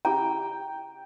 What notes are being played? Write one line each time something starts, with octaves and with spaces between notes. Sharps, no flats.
C#3 E4 G4 G5 A#5